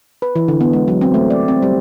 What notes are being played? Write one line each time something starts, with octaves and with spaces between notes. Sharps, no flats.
B4
E3
D3
B3
G#3
F#3
C4
A3
D5
C4
G3